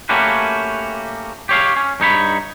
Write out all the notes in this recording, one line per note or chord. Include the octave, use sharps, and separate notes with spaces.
A3 A#3 C#4 F#4 G4 B4
G4 C#5 F5
C#4
G2 D#4 C#5 B5